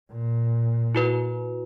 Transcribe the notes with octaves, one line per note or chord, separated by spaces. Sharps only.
A#2
E4 F#4 B4